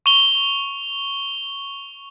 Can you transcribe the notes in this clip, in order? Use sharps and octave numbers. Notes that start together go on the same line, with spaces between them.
C#6 F7 G7